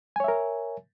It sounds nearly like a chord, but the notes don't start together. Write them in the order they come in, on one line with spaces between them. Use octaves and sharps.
G#5 C#5 E5 A#4